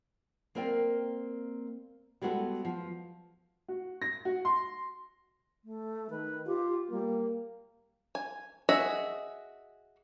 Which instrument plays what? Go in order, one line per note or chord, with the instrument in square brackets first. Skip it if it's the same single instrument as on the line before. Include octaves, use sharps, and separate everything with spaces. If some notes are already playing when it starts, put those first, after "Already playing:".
[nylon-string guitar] A#3 C4 A#4 D5 G5
G3 G#3 B3 F#4 A4
F3
[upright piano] F#4
A#6
F#4
C6
[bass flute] A3
[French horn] D#3 [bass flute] B4
[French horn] F4 [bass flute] G4
[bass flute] G3 [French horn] A#3
[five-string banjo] G#5
F#4 G#4 D#5 E5